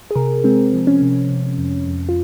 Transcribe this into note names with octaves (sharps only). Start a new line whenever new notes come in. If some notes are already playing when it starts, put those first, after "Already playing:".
G#4
C3 A#4
G#3 C4
F3
C#4
C3
C3
F2
F2
F4